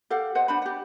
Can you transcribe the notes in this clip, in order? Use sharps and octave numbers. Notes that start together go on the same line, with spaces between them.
G4 A4 F5 F#5
C5 D#5 F#5
D4 C5 B5
G4 F#5